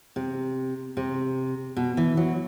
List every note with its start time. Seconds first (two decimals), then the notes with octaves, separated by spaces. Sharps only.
0.16 C3
0.97 C3
1.76 B2
1.97 E3
2.17 F#3